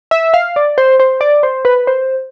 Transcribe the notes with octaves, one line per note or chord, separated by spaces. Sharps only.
E5
F5
D5
C5
C5
D5
C5
B4
C5